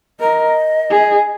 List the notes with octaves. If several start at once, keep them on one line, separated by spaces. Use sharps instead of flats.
A#4 D#5
G#4